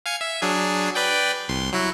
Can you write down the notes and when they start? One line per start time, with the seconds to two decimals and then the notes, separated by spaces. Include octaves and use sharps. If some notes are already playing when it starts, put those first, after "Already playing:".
0.06 F5 G#5 C#7
0.21 E5
0.42 F#3 D4 G#4
0.95 B4 D5 G5
1.48 C2 C6
1.73 F#3 E4 F#4